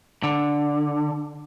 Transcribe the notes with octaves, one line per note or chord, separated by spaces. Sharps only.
D3